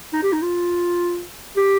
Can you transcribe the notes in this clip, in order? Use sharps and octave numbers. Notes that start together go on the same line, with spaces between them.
D#4
G4
D#4
F4
G4